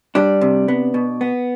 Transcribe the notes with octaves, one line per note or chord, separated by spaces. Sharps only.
G3 D4
C3
B3
B2
B3